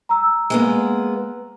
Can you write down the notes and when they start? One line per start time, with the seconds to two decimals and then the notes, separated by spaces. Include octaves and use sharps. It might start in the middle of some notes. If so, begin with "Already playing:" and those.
0.09 A#5 E6
0.50 G#3 A#3 B3